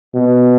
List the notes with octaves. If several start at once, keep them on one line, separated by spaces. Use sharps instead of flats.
B2